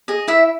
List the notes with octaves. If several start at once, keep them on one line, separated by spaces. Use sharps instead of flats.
G#4 D#5
E4 E5